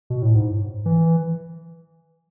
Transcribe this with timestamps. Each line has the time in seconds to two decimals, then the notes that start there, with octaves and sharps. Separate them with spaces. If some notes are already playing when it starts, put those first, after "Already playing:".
0.10 B2
0.22 A2
0.35 G#2
0.86 E3